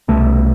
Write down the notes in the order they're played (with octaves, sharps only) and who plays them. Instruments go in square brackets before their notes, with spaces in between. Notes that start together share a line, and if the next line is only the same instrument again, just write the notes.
[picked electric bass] C2 B2 A3